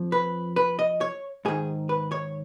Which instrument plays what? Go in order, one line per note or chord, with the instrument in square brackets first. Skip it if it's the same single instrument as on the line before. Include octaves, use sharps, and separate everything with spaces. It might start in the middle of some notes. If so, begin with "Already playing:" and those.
Already playing: [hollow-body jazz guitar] F2 F3
B4
B4
D#5
C#5
G#2 D#3 G#4
B4
C#5